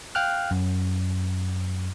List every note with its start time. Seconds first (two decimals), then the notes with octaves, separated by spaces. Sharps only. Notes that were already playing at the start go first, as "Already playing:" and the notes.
0.15 F5 G5 F6 F#6
0.51 F#2